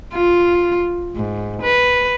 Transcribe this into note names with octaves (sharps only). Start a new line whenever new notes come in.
F4
G#2
B4